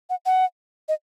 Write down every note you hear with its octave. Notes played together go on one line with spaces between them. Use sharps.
F#5
F#5
D#5